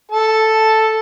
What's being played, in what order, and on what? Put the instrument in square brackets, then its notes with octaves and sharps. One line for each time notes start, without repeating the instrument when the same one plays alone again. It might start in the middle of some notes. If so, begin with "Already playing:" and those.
[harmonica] A4 A5